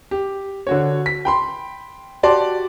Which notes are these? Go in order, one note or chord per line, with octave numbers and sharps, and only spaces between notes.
G4
D3 F#4 C#5
B6
G5 B5 C6
F#4 G4 D5 A5 C6